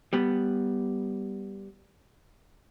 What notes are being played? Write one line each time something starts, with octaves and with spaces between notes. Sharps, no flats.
G3 B3